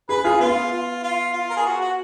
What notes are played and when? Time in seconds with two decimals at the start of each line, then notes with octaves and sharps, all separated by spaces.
0.09 G#4 B4
0.24 F4 G#4
0.40 B3 F4
0.72 F4
1.03 F4
1.33 F4
1.50 A#4
1.57 G#4
1.65 F#4
1.81 F#4